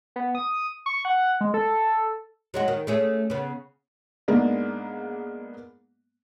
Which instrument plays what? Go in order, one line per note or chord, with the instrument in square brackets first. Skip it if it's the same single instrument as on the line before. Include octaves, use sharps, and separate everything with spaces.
[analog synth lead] B3
D#6
C#6
F#5
G#3
A4
[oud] F#3 G#3 F#4
D#3
A3 C#4 G#4
C#3 B3
[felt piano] G#2 G#3 A#3 B3 D4